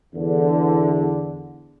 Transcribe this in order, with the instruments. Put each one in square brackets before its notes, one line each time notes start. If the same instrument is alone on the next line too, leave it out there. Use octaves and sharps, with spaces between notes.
[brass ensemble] E2 D3